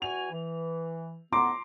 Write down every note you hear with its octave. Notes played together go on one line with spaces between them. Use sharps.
E2 F#4 G#5 F7
E3
A2 B3 A#5 C6 D6